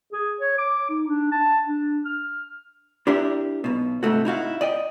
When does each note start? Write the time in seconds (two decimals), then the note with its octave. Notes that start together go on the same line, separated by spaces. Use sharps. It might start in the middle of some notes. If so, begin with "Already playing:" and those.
0.13 G#4
0.41 C#5
0.58 D6
0.89 D#4
1.08 D4
1.31 A5
1.67 D4
2.06 F6
3.07 D4 E4 G4 A#4 D5 E5
3.64 B1 B2
4.03 G#2 C3 A3 F#4
4.25 D#4 E4 F#4 F5
4.61 D5 D#5 G5